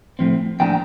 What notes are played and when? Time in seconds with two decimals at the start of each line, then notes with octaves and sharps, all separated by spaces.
0.19 A2 F3 C4
0.60 A2 F3 A#3 D4 G5 A#5